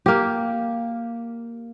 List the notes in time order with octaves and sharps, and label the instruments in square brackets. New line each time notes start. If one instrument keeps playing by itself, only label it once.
[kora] A#3 G4